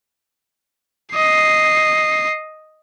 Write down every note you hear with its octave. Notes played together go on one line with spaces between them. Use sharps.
D#5 C7